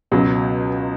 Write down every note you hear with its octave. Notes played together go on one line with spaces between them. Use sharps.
C#2 B2 F#3